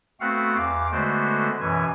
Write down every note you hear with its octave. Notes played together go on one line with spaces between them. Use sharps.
A3 B3 C4 F#4 F5 F#5
E2 F5 D6
D3 G#3 A3 B3 F#4 C5
F#2 B2 E3 G#5